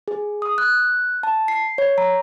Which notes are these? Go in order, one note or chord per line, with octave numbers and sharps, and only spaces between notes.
G#4
D#6
F#6
A5
C7
C#5
A#5